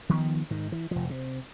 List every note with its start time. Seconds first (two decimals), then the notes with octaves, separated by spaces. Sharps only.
0.09 D#3 F3 G3 B3
0.51 G#2 D#3
0.72 E3
0.91 F1 F3
1.10 C3